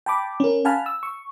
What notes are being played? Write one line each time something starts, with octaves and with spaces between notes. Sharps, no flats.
G5 A5 B5 D6
C#4 A#4
F5 F#5 G#5 A5 B5 F6
E6
C#6